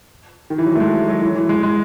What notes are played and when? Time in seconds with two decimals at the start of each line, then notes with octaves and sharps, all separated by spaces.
0.50 D#3
0.58 E3
0.66 F#3
0.75 A3
0.80 G#3
1.08 F#3
1.22 E3
1.35 E3
1.49 G#3
1.63 G#3